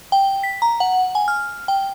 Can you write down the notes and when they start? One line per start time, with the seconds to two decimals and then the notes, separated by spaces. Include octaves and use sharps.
0.12 G5
0.43 B6
0.62 A#5
0.80 F#5
1.15 G#5
1.28 F6
1.68 G5